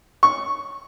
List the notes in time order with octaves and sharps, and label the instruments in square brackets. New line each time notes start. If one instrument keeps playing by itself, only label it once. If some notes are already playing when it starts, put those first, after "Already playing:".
[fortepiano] C#6